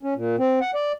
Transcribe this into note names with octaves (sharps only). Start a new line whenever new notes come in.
C#4
A#2
C4
F#5
D5